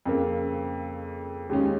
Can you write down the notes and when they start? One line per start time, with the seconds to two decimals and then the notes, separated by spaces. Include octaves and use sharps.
0.06 F2 C#3 A#3
1.49 D#2 C#3 G#3 C#4